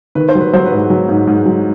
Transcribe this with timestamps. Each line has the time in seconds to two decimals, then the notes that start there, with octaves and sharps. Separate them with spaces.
0.15 D#3 B4
0.29 C5
0.35 F#3
0.41 B4
0.53 F#3 C5
0.66 B4
0.72 G#2
0.90 F#3
1.09 G#2
1.27 G#2
1.46 F#3